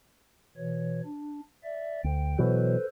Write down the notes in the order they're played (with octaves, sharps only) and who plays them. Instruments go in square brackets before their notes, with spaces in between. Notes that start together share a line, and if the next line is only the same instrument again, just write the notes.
[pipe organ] B2 E3 C#5
D4
D5 E5
[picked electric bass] D2 [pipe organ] G5
[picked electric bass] B2 E3 F#3 [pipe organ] A4 B4 C5